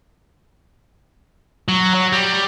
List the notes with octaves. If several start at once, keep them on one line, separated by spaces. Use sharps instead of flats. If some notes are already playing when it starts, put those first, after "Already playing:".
F#3
F#3
G3